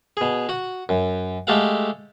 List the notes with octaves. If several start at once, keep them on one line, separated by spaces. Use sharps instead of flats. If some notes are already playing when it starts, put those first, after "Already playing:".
B2 G#4
F#4 F#5
F#2
G#3 A3 G4 A4 F5 F#5